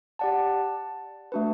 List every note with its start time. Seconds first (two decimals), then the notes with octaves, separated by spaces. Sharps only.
0.19 G4 D5 F#5 A5
1.32 A3 D4 F#4 B4